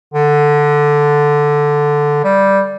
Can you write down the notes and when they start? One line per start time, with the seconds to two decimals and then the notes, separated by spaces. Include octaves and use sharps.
0.14 D3
2.24 G3